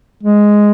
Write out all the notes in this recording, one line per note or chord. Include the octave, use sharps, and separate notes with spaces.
G#3